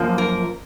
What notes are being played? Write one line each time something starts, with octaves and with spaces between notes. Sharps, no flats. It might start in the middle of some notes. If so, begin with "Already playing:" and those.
Already playing: F#2 F3 A#3
A#4